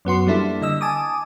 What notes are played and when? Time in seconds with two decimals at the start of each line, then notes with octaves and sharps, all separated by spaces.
0.05 F#2 B3 F#4 C6
0.27 G3 A#3 D4 E4 A4
0.62 D3 D#5 E6
0.81 G#5 A5 D6 D#6